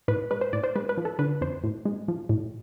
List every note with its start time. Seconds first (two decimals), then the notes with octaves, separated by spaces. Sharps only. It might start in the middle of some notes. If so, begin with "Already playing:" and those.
0.08 A2 B4
0.31 G#3 B4
0.41 C5
0.53 A2 D5
0.64 C5
0.76 G#3 B4
0.89 B4
0.97 F3
1.05 A4
1.19 D3 B4
1.41 F2 C5
1.64 A2
1.85 G#3
2.08 F3
2.29 A2